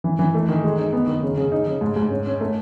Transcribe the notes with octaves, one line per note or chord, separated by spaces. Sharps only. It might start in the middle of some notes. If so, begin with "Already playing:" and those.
E3
E3
A3
D#3
G#3
D#4
B3
D#3
C#3
C#3
D#4
C#3
G#2
G#2
C#4
C#4
A3